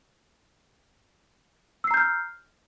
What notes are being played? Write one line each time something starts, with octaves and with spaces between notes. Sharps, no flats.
A#5 E6 F6 G6 C7